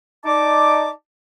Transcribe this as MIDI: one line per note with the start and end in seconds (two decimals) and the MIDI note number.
0.25 0.90 63
0.25 0.90 74
0.25 0.90 81
0.25 0.90 86